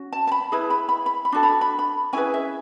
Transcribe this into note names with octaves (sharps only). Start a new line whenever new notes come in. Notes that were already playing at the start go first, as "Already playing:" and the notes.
Already playing: C#4 F#4
A5
A5
B5
E4 G#4 B4 B5
B5
B5
B5
B5
D4 F#4 A4
B5
B5
B5
C#4 E4 G#4 B4 G#5
E5